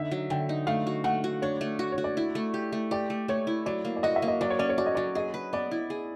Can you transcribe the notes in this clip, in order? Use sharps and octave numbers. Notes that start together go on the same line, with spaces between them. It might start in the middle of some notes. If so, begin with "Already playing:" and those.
Already playing: D3 D#4 E5
F#3
D3 G5
D#4
A3 F5
F#4
A3 F#5
F#4
D4 C#5
A3
F#4
C#5
F#4
D5
E4
A3
G4
A3
G4 D5
A3
A3 C#5
E4
F#3 D5
A#3
D5
F#4 D#5
E5
A#3
D#5
F#3 D5
C#5
C#4 D5
C#5
F#4 D5
D#5
F#3 D5
G#4 D#5
B4
B3 D5
E4
G#4